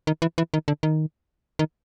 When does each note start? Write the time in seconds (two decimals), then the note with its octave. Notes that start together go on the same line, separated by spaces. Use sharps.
0.07 D#3
0.22 E3
0.38 E3
0.54 D#3
0.68 D3
0.83 D#3
1.59 D#3